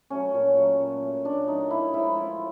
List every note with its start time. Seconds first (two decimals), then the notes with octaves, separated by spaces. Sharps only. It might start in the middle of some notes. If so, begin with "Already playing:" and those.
0.10 F#3 A3 C#4
0.34 A#2
0.57 F#3 A3
0.80 A#2
1.03 F#3 A3
1.25 A#2 D4
1.47 F#3 A3 D#4
1.71 A2 E4
1.94 F3 G#3 E4
2.16 A2 F4